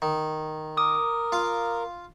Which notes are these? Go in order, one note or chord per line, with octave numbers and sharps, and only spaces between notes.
D#3
A#4 D6 D#6
F4 F5